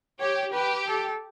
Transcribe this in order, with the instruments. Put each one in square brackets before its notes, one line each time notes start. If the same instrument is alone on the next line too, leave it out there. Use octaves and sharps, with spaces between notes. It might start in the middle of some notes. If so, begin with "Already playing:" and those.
[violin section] G4 [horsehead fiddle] C#5
[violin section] G4 [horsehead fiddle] B4
[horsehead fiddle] A4